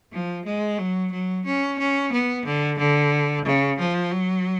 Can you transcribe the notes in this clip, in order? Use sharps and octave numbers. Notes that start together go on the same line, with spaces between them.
F3
G#3
F#3
F#3
C#4
C#4
B3
D3
D3
C#3
F3
F#3